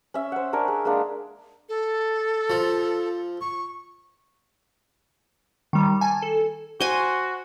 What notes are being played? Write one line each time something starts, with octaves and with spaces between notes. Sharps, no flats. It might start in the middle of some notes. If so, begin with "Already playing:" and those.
C#4 E5
C5 F#5
D4 A#4 G#5 C#6
G#4
G#3 A#3 D4
A4
F3
C#6
D#3 G3
G#5 A5
A4
F#4 C5 G#5